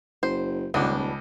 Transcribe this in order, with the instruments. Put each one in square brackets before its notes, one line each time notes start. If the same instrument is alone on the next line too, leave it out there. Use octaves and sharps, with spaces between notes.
[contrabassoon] F#1 [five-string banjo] C5
[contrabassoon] D#1 [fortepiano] C#2 [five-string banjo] B3 D4